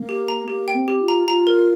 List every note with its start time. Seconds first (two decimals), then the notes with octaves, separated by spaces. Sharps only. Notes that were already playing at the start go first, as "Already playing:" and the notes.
Already playing: A#3
0.09 G4
0.28 A#5
0.48 A#3 G4
0.68 G5
0.75 C4
0.88 G4
1.01 F4
1.08 A#5
1.28 F4 A#5
1.47 A#4